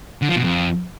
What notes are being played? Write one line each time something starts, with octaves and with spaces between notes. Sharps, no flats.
D3
F3
B2
F2